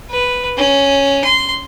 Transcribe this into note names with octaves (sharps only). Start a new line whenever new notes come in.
B4
C#4
C6